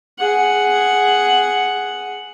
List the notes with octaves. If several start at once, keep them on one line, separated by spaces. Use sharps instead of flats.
G#4 F#5